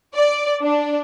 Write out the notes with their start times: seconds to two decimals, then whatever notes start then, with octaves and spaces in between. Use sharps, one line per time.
0.14 D5
0.62 D4